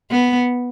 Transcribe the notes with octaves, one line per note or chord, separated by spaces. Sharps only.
B3